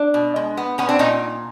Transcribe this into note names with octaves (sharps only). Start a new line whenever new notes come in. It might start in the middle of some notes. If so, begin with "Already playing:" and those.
Already playing: D4
B2
G#3
B3
A#2 B3 C#4
C4 D4
A#2 C#4 D#4